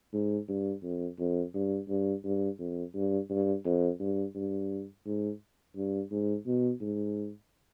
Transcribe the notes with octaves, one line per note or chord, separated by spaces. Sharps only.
G#2
G2
F2
F2
G2
G2
G2
F2
G2
G2
F2
G2
G2
G#2
G2
G#2
B2
G#2